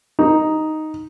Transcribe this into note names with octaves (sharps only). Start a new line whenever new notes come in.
D#4